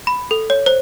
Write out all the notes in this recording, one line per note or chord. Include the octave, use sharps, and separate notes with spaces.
B5
A4
C#5
C5